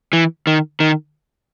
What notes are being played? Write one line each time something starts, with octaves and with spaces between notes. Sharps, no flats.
E3
D#3
D#3